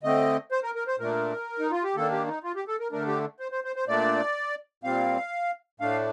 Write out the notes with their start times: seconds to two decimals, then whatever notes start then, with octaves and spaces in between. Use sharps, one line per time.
0.03 D3 A3 C4 D#5
0.52 C5
0.63 A#4
0.75 A#4
0.87 C5
0.99 A#2 A3 D4 A#4
1.59 D#4
1.71 F4
1.84 G4
1.96 D#3 A#3 D4 A4
2.12 G4
2.28 D#4
2.44 F4
2.55 G4
2.68 A4
2.79 A#4
2.92 D3 A3 D4 A#4
3.07 G4
3.40 C5
3.52 C5
3.64 C5
3.76 C5
3.87 A#2 A3 D4 D5
4.84 A#2 G3 C4 F5
5.80 A2 A3 D4 F5